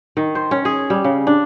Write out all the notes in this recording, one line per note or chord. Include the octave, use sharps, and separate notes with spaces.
D#3
C5
C#4
G#4
G3
C#3
D4